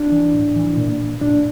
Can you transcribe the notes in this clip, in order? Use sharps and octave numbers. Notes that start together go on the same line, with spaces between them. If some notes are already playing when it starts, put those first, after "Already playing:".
Already playing: D4
E3
A2
E3
A#2
A#2 D4